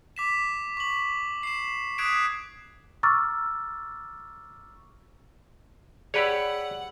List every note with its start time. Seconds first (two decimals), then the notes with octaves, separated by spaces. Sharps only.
0.16 D6 B6 E7
0.77 C#6 F#7
1.43 C7 E7
1.98 D#6 F#6 G#6 B6 D7 E7
3.03 A#5 C#6 D6 E6 F6 A6
6.14 G4 G#4 B4 C#5 D5 F#5 B5 E6